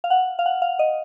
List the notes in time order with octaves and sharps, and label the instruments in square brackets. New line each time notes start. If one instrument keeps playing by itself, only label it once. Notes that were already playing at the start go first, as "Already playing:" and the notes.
[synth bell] F5
F#5
F5
F#5
F5
D#5